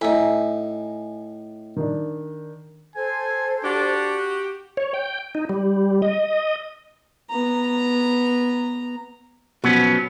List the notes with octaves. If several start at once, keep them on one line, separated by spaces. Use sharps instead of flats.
A2 D#4 E5 G#5 A#5
D#3 D4
A4 C5 G#5
D4 F#4 G4
C#5
G5
D#4
G3
D#5
B3 A#5
B2 F3 F#3 B3 C#4